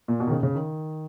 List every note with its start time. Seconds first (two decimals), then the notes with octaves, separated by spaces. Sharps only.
0.08 A#2
0.20 B2
0.27 D#3
0.31 C#3
0.43 C#3
0.55 D#3